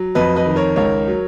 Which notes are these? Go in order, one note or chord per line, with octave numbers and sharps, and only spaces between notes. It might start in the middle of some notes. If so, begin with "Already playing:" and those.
Already playing: F#3
F2 B4 D#5
B4 D#5
D#3
A#4 C#5
C#2 A#4 C#5
F#3